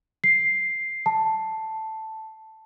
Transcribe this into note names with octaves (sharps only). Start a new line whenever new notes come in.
C7
A5